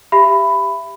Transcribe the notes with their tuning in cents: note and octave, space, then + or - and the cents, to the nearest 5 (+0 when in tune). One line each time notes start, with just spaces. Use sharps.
G4 +0 E5 +25 B5 +15